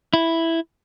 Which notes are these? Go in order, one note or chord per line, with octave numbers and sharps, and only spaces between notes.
E4